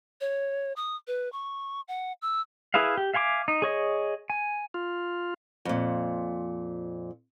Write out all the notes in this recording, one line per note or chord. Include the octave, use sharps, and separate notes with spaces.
C#5
D#6
B4
C#6
F#5
E6
E4 G#4 B4 E5 F5
G4
E5 F5 G#5 C6 D6
D#4
G#4 C#5 D#5
G#5
F4
F2 A#2